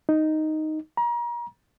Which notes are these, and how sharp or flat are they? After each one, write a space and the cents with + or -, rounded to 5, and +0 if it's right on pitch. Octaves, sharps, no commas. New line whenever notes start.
D#4 +0
A#5 +35